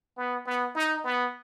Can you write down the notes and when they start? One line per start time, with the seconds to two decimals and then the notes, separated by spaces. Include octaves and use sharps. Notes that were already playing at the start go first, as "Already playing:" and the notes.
0.17 B3
0.46 B3
0.75 D#4
1.05 B3